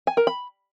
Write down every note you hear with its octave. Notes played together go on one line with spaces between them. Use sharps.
G#5
A#4
B5